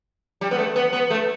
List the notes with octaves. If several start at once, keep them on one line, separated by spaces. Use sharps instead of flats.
G3
B3
A3
B3
B3
A3